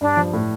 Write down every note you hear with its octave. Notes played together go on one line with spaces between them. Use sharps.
G2 D4
F3
A2